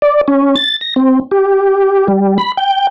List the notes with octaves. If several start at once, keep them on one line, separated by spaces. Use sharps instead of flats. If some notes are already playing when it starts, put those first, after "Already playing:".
D5
C#4
A6
A#6
C4
G4
G3
B5
G5